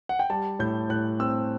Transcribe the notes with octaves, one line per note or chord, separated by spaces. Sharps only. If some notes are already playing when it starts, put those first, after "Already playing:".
F#5
G5
G3 A5
A2 G6
A2 F#6
C4 E6